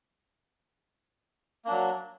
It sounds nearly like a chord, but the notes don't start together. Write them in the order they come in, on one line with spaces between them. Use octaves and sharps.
A#3 D4 F#3